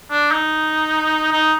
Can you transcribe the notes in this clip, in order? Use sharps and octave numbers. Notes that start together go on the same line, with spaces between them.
D4
D#4
D#4